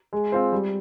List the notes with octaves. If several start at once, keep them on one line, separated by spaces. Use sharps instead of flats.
G#3
C4 F4 C5
G3